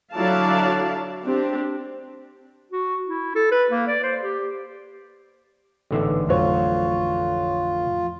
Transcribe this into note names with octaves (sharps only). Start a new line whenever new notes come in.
D3 F#3 E4 D5 F5 A5
C4 D4 G4
F#4
E4
A4
B4
A#3
D5
C5
G4
A1 G#2 D3 B3 E5
F2 A2 F#3 F4 C#5